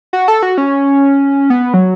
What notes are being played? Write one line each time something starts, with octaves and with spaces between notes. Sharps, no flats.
F#4
A4
F#4
C#4
B3
F#3